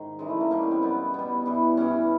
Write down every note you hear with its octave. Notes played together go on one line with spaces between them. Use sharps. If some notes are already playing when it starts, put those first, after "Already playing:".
Already playing: G#2 D#3
F#2 C#3 E3 G3 G#3
A3
A#3
F#2 C#3 E3 G3 A#3
B3
C4
B2 G3 B3
B2 G3 B3
G2 E3 G3
G2 E3 G3 C#4